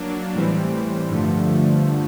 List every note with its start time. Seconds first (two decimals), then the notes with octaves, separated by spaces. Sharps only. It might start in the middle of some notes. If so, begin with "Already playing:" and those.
Already playing: F#3 A#3 D4
0.35 A2 E3 G3 C4
1.10 G2 D3 F3 A3